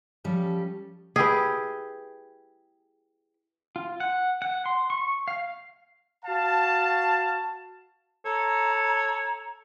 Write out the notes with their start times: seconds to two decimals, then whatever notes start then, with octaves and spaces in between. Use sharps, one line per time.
0.24 F3 G3 C#4 G4 A4
1.16 E4 G4 G#4 B4
3.76 F4
4.00 F#5
4.42 F#5
4.66 C6
4.90 C#6
5.28 F5
6.25 F#4 F5 A5
8.25 A4 C#5 A#5